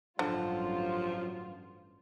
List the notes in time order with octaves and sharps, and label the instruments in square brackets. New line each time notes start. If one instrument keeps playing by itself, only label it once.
[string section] A1 G2 F4 [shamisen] D3 [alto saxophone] F3 [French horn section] F#3